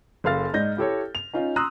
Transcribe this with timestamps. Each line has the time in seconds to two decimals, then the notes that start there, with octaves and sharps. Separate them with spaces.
0.24 F#1 A4 A#4 F5 F6 A6
0.53 G#2 D#4 D5 G6 A#6
0.77 E4 G4 A4 C#5
1.15 F7
1.34 C#4 D#4 F4
1.56 A#5 C6 D#6 E6 F#6